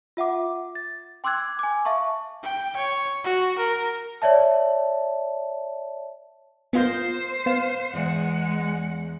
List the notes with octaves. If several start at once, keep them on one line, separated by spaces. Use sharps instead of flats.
F4 E5 F#5 D6
A6
G5 C6 D6 E6 F#6 G#6
G#5 D6
E5 F5 A5 C#6
G5
C#5
F#4
A#4
C#5 D5 E5 A5
B3 F4 A#4 C5 D#5 G#5 G6
B3 F5 E7
E2 G#3 F#5